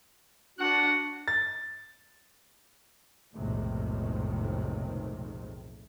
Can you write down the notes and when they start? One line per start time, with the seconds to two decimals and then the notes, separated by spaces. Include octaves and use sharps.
0.59 D4 F#4 F#5
1.28 A6
3.33 B1 F2 A2 C3 D#3 G#3